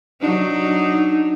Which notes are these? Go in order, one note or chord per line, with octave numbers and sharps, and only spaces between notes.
F#3 D4 D#4